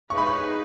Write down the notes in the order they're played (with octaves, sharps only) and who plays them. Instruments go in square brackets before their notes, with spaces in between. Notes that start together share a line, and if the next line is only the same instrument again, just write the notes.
[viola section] G#3 D#4 G#4 B4 [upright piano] C#6
[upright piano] B5
C#6